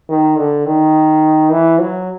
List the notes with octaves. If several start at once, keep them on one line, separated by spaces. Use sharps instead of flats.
D#3
D3
D#3
E3
F#3